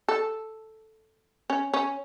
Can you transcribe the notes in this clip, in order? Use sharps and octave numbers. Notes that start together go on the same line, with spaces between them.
A4
C#4
C#4